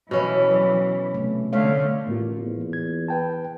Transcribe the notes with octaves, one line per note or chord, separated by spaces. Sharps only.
B2 E3 C#4 E4
F#3 D5
C3 A3
D3 A3 C#5 F5
A1 A2 A#3 F4
E2
G#6
B4 G5 A5